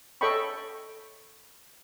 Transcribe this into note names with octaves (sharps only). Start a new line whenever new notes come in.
A4 C#5 D#5 G5 B5 C#6